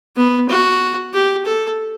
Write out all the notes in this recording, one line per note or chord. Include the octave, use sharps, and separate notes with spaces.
B3
F#4
G4
A4